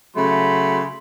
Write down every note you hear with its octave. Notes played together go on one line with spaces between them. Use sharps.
C#3 F#3 A3 B5 C6